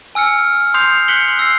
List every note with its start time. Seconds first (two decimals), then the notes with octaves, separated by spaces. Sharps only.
0.15 G#5 E6 F6 C#7
0.74 C6 D#6 G6 C7 F7
1.08 F#6 B6 C#7 F#7 G7
1.39 E6 F#6 A#6 C7